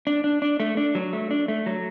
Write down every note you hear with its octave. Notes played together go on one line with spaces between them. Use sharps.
D4
D4
D4
A3
D4
F#3
A3
D4
A3
F#3